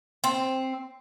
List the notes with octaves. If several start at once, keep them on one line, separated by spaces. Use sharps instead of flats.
C4